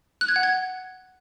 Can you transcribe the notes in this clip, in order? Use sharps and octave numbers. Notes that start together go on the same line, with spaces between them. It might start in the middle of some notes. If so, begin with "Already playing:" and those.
F#6
G#6
F#5
G#6